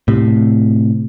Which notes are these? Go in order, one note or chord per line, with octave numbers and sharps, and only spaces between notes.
A2 C3